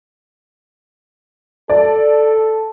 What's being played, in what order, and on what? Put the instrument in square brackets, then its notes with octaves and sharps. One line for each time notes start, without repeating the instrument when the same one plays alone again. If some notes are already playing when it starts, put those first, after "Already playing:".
[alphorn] A4 [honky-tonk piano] D5